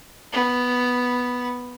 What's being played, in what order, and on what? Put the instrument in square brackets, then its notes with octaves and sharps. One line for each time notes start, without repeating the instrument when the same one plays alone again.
[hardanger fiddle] B3